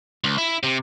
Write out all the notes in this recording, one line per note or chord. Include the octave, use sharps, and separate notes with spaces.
C#2
E4
C3